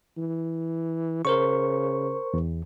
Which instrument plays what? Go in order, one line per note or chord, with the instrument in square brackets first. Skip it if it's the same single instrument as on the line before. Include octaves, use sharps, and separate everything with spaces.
[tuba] E3
[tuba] C#3 [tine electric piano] A#4 C5 C#6
[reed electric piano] E2